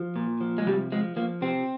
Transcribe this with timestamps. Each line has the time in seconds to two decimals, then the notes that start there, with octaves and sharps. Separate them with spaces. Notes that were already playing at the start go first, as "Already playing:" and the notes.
Already playing: F3
0.16 A#2
0.41 F3
0.58 G#3
0.66 C3 G3
0.92 F3 G#3
1.16 F3 A#3
1.41 C3 C4